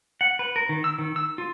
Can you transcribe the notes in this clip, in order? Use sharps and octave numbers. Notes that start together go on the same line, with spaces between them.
F#5
B4
A#4
D#3
E6
D#3
E6
F4